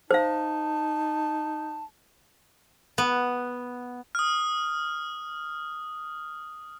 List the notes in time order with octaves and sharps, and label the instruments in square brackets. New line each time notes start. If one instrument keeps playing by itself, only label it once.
[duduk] D#4 [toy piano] C5 F5 [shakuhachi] A5
[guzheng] B3
[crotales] D#6 F6